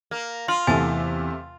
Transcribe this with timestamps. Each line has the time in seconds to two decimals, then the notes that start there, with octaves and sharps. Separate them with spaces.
0.11 A#3
0.48 F4 C6
0.67 E2 C3 A3 G#5 A5 A6